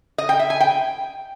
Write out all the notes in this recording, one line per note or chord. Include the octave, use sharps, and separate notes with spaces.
D#5
G5
E5
G#5
G5